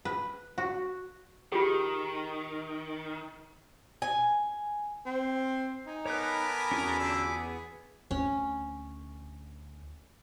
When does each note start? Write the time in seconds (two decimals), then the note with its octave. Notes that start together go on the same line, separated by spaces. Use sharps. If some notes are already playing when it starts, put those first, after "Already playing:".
0.05 B4
0.58 F#4
1.52 D#3 F4 G4 G#4
4.02 G#5
5.06 C4
5.87 D#4 G#5
6.06 B3 A4 A#4 C#5 G#5 B5 D6 F#6
6.72 E2 C#4 F4 F#4
6.99 D3 D4 E6
7.28 B3 G#4
8.11 D2 C#4